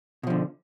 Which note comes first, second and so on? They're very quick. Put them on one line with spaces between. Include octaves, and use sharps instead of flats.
B2 F3 D3